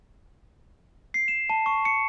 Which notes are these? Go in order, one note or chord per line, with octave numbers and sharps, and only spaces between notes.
C7
E7
A5
C#6
C#7